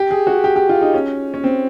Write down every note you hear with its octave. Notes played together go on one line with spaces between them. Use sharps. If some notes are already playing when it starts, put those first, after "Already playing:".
Already playing: G4
G#4
F#4
G4
G4
F4
D#4
C#4
C#4
C4